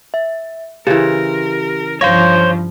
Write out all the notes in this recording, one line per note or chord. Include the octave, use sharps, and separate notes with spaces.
E5
C#3 E3 G4 A#4
G2 F3 C5 C#5 F5 A#6